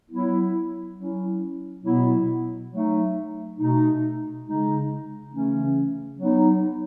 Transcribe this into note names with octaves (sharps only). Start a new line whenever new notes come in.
F#3 B3 E4
F#3 C#4 E4
B2 F#3 B3 E4
F#3 A3 D#4
B2 A3 D#4
C#3 G#3 D#4
C#3 E3 A3 C#4
F#3 B3 D#4